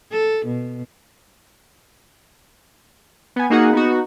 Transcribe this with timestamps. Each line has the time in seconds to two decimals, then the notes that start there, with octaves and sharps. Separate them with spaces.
0.11 A4
0.45 B2
3.36 B3 G#5
3.50 A#3 D#4 F#4 G#4 F#5
3.73 B3 D#4 F#4